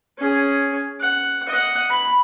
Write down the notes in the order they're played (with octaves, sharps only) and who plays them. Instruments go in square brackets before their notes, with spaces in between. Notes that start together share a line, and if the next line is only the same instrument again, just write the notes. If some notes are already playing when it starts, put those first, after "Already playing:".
[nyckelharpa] C#4 G#4
F#5
D#5 F#5
B5